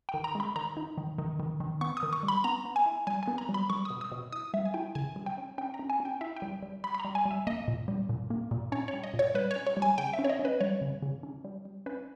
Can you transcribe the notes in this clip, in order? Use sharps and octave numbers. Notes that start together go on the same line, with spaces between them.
G5
D#3
A#5
G#3 B5
D#3 A#5
D#4
D#3
D#3
D#3
D#3
B3 C#6
D#6
D#3
C#6
G3
B5
B3 A#5
B3
G#5
E4
G3 G#5
B3 G#5
A#5
G3
B5
G3 C#6
D#6
B2
D#6
B2
E4 D#6
G3 E5
G#5
E4 G5
C#3 G#5
G3
G5
C#4
C#4 G5
A#5
C#4
G#5
C#4
G5
E4 E5
G5
G3
G3
G3 B5
B5
G3 A#5
G#5
G3
E5
A#3 D#5
A#2
G3
A#2
A#3
A#2
C#4 C#5
C#5
G3
D#5
A#2
C#5
G3 B4
C#5
C#4
C#5
G3
G#5
C#3 G5
E5
C#4
C#5
D#5
C#4
B4
G3 C#5
C#3
C#3
C#4
G3
G3
C#4 B4